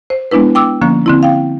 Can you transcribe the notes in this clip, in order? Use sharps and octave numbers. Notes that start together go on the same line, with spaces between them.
C5
G#3 B3 D4 E4 B4
G5 D6 E6
D3 F3 A#3 C#4
D3 C4 E4
F5 G5